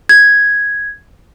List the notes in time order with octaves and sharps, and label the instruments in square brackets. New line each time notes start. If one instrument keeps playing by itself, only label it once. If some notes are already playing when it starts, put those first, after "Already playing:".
[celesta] G#6